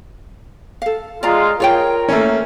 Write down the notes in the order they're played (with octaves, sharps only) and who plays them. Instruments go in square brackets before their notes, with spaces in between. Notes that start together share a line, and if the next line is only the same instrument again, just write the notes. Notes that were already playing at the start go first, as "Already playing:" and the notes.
[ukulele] A4 F5
[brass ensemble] G#3 F4 [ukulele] D5 A#5
[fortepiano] F4 [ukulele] G#4 C#5 G5 [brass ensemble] A#4
[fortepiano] A3 A#3 C#4